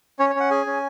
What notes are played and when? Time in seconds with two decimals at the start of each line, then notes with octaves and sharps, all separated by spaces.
0.19 C#4 C#5
0.30 C#5
0.35 C#4 F#5
0.51 G#4 G#5
0.66 C#4